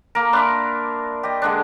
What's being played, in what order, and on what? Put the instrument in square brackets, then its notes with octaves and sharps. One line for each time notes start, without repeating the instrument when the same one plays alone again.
[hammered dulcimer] A#3 A#4 [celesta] A#5
[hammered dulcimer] D4 E5 [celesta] B5 C6 F6
[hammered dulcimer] G4 D#5
D3 G#3 D4